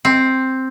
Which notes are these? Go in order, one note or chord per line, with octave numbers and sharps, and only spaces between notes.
C4